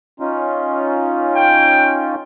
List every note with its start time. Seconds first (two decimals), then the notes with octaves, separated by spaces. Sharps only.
0.20 C#4 D#4 F4
1.36 G5